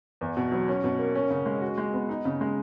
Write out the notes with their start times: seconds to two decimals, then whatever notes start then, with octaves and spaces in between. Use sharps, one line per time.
0.21 E2
0.37 B2
0.52 F#3
0.68 C#4
0.84 B2
0.99 A#3
1.15 C#4
1.30 C#3
1.46 G#3
1.62 F#4
1.78 G#3
1.93 B3
2.09 D#4
2.25 C#3
2.41 G#3